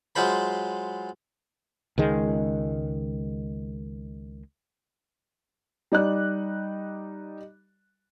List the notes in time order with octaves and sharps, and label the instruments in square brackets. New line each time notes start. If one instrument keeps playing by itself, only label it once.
[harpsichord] F#3 G#3 F4 C5 B5
[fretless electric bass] C#2 D#3 G#3
[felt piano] G3 D#4 D5 F#6